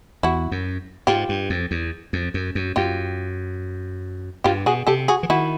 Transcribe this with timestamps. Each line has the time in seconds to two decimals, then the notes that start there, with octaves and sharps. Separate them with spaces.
0.23 E2 E4 F#4
0.51 F#2
1.07 G#2 F4 G4
1.29 G2
1.50 F2
1.71 E2
2.13 F2
2.34 F#2
2.55 F#2
2.76 F#2 F4 G4
4.44 G2 F4 G4
4.66 B2 F#4 G#4
4.87 C3 G4 A4
5.08 F#4 G#4
5.23 E3
5.29 D#3 E4 F#4